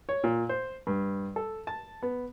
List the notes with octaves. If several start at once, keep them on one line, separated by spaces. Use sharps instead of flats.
C#5
A#2
C5
G2
A4
A5
B3